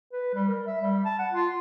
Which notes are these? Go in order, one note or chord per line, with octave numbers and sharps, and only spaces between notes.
B4
G3
A#4
E5
G3
A5
F#5
F4